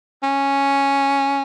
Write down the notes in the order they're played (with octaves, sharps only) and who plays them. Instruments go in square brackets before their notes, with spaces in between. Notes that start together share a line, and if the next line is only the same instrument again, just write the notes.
[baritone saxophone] C#4